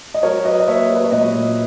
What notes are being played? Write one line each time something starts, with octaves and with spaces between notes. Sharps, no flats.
D#5
F#3 A#4 C#5
F#3 B4 D#5
D#5
A#3 C#5 E5
F#3
B4
C#5
A#2 B4 D#5
A#2